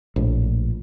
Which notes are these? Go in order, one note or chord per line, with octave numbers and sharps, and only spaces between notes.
A#1 A2